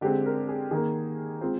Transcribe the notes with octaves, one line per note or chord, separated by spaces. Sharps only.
D3 G#3 C4 G4
A#4
G#4
D#3 A#3 G#4
G#3 C4 F4